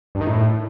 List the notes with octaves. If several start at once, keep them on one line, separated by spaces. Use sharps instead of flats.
G2
D#3
A2